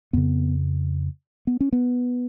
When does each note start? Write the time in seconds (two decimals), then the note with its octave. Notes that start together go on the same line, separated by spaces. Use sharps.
0.13 F2 C#3 B3
1.47 B3
1.60 C#4
1.73 B3